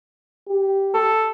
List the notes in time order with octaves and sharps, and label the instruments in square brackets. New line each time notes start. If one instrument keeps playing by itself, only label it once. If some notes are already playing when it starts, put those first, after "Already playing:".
[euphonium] G4
[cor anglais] A4